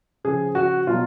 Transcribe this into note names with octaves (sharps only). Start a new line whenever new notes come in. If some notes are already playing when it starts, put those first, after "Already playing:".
C#3 F3 G#4
F#4
B2 F#3 F4